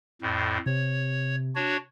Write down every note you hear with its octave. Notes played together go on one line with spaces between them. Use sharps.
F2 A2
C3 C#5
D4 F#4 C#5